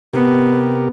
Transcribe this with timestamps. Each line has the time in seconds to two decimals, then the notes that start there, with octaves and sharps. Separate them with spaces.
0.13 C3 B3 G4 A#4